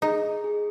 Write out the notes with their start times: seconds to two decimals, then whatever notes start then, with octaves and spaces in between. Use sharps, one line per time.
0.02 D#4 G#4
0.24 D#5
0.44 G#4